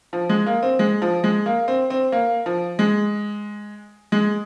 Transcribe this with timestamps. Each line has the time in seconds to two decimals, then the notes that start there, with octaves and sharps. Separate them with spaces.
0.13 F3
0.29 G#3
0.46 A#3
0.63 C4
0.79 G#3
1.02 F3
1.24 G#3
1.46 A#3
1.68 C4
1.90 C4
2.12 A#3
2.46 F3
2.79 G#3
4.12 G#3